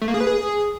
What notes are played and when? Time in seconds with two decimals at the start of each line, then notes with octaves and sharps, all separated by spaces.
0.02 A3
0.08 A#3
0.14 G#4
0.20 B4
0.27 G#4